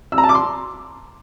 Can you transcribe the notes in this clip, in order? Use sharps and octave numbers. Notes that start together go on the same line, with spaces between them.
E6
A#5
A5
D6
C6